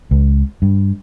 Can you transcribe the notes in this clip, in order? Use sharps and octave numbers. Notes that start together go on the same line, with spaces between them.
C#2
G2